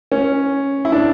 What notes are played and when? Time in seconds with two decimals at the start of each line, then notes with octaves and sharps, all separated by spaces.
0.12 C#4
0.85 E4
0.92 D4